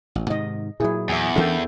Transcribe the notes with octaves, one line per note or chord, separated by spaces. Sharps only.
A1
G#2 C3 D#3 D#5
A#2 F#3 E4 G#4
E2 E5 G#5
E3 C#4 D4 A4 A#4 G5